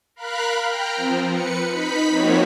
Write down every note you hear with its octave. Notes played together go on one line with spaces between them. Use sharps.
A#4 F5 B5 F#6
G5 A#5 F6
F3 C4
B4 C#7
D#4 B5 B6
F3 A#3 C4 D#4 F#4 C#5